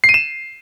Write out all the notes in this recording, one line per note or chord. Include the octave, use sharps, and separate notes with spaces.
C7
D#7
E7